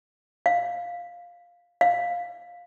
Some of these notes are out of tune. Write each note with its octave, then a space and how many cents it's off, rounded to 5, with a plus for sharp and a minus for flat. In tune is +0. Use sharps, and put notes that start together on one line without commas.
F5 +5
F5 +10